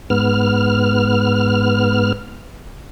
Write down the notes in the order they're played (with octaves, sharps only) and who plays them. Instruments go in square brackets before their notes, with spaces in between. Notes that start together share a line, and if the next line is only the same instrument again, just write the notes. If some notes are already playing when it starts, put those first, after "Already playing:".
[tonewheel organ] G#2 B3 F6